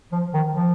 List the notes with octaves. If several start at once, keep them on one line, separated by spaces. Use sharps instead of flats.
F3
D#3
F3